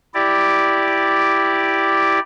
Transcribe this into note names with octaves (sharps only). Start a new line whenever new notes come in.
E4 G4 D5